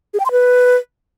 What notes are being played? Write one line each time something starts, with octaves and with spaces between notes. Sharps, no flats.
G#4
G5
C6
B4